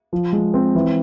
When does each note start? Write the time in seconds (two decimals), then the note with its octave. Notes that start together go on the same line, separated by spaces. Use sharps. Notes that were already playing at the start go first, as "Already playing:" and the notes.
0.13 F3
0.33 G#3
0.54 C4
0.75 E3